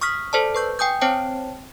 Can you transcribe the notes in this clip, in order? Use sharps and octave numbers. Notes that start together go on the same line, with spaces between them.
C#6 D#6 F6 B6
A4 C5 D5 A5
B4 C#6 G6
G5 G#5 D#6 G6
C4 C5 C#5 G5 A5